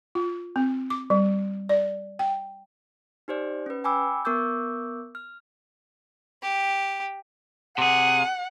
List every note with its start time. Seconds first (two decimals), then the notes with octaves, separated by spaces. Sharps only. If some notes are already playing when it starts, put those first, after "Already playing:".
0.15 F4
0.56 C4
0.90 D6
1.10 G3
1.69 D5
2.19 G5
3.28 D#4 G4 C5 D5
3.66 C#4 B4
3.84 G5 G#5 B5 D6 E6
4.25 B3 A#4 C#6 D6 E6 G6
5.15 F6
6.42 G4
7.78 C3 G#4 F#5